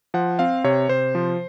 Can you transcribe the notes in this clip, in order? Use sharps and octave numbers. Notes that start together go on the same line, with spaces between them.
F3 F#5
C4 F5
C3 C#5
C3 C5
F3